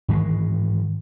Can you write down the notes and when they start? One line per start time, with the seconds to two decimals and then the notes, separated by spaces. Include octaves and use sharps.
0.09 G#2 D#3 E3 G#3